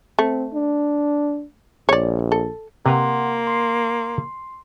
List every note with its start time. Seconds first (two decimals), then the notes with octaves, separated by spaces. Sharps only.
0.19 A3 C4
0.54 D4
1.89 A#1 C#5 D5
2.32 A4
2.86 C3 A#3 B4 F#5 A#5 C6
3.47 C6 C7